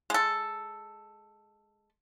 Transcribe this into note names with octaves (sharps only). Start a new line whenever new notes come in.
G#3 A4